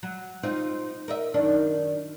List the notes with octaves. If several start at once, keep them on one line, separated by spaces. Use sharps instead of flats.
F#3
C4 D#4 F4
A#4 D#5 E5
F#2 D#3 D4